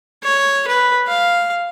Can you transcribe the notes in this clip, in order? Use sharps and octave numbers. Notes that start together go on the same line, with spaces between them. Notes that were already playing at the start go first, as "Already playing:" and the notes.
C#5
B4
F5